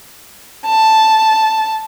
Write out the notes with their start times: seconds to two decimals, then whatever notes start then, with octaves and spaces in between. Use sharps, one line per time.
0.66 A5